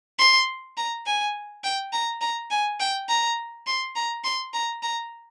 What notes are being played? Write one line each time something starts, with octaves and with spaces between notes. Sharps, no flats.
C6
A#5
G#5
G5
A#5
A#5
G#5
G5
A#5
C6
A#5
C6
A#5
A#5